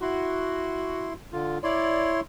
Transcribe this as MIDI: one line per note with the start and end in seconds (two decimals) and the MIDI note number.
0.02 1.14 64
0.02 1.13 66
0.02 1.14 84
1.33 1.58 50
1.33 1.58 65
1.63 2.21 64
1.63 2.21 73
1.63 2.11 74
1.63 2.21 84